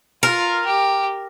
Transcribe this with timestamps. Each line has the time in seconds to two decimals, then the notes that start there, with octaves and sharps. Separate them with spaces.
0.23 F4 A#4
0.66 G4